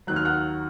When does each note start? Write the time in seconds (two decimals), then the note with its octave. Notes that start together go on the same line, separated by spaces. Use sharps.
0.07 D#2 D#3 F#3 F#6
0.16 F6
0.25 F#5 F#6